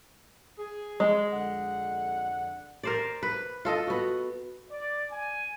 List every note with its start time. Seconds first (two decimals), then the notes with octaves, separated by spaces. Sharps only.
0.59 G#4
1.00 G#3
1.32 F2 D3 F#5
2.83 A#4 C5 D5
3.23 B4
3.65 F4 A4 D#5
3.87 B3 F#4
4.70 D5
5.11 G#5